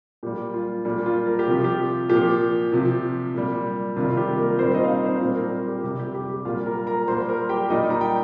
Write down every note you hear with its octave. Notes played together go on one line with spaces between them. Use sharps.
A#2 G3 G4
F4
A#2 G3 F4
F4
A#4
G4
C3 F3 F4
G4
A#2 F3 G4
C3 F3
A#2 G3
C3 D#3 G3 F4
F4
G4
A#3 A#4
A#2 G3 C4 C5
D#4 D#5
F5
D#4 D#5
C4 C5
A#2 G3 C4 C5
A#3 A#4
G4
C3 G3 G4
G4
G4
G4
A#2 G3 F4 F5
A#4 A#5
A#4 A#5
A#2 G3 C5 C6
A#4 A#5
G4 G5
A#2 G3 D#4 D#5
A#5
G5